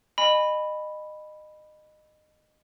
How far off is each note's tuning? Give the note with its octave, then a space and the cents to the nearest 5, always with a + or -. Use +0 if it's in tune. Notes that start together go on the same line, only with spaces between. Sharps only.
D#5 -25 G#5 -30 B5 +0